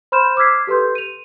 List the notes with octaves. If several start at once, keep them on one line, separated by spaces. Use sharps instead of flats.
C5 B5 C6 F6 G6 E7
D6 E6 F6 G#6 B6 C7
G4 A4 B4 C6 G6
D#7 F7